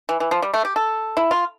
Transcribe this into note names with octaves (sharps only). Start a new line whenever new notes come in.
E3
E3
F3
G3
A3
G4
A4
E4
F4